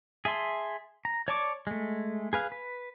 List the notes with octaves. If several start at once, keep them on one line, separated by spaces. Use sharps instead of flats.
G#4 E5 A5 C6
A#5
C#5 D5 A5 C#6 D6
G#3 A3
G#4 B4 F5
B4